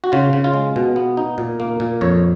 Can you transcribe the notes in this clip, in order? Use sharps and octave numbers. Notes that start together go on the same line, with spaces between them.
F#4
C#3 F4
C#3
F4
G#3
B2
B3
D#4
A#2
A#3
A#2
F2 C#5